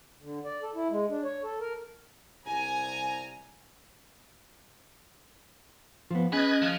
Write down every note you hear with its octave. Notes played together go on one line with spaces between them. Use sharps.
D3
D5
A4
E4
G#3
D4
C#5
A4
A#4
C2 G#5 A#5
F3 B3
C#4 G#4 B4 D#5 F#6 G#6
F3